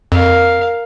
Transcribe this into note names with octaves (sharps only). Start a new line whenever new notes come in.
F2 A#4 F5